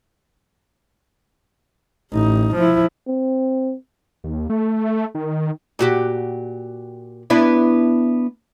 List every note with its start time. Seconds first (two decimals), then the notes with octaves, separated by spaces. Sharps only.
2.13 A1 D#4
2.56 F3 E4
3.07 C4
4.24 D#2
4.50 A3
5.15 D#3
5.79 A#2 F#4 G4
7.30 B3 D4 E4